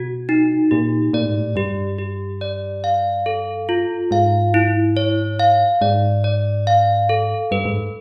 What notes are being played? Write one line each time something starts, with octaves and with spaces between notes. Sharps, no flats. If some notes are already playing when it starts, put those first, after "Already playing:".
Already playing: B2 F#4
D#4
A#2 G4
A#2 D5
A2
G#2
A2
G2 G4
G4
D5
F5
A4
F4
G#2 F5
E4
C#5
F5
G#2 D5
D5
F5
A4
G2 B4
G#2